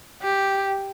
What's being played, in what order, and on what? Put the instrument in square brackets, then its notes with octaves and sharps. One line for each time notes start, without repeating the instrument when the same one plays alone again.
[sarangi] G4